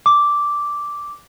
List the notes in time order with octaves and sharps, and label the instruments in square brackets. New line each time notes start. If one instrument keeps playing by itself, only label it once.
[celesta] D6